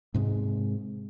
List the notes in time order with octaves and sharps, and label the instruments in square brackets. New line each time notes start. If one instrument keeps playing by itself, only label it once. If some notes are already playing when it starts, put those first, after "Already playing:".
[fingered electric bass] G#2 C3 G#3